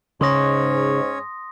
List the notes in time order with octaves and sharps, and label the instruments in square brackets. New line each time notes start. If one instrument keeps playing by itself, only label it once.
[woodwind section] G#2 [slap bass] C#3 [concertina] C#4 C#5 [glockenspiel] C6 D#6 A#6